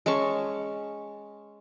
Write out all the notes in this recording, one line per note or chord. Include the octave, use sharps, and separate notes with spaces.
G#3 C#4 A5 C#6